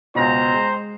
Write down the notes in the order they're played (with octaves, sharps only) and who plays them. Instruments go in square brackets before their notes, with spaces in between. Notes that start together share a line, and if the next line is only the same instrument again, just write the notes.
[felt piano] C#2 B2 [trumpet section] C5 G5 A#5
[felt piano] G#3